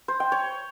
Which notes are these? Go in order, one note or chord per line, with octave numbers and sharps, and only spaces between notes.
C5
G5
C#5